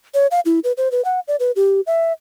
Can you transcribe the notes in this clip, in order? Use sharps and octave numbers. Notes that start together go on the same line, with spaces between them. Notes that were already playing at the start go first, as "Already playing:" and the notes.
C#5
F5
E4
B4
C5
B4
F#5
D5
B4
G4
E5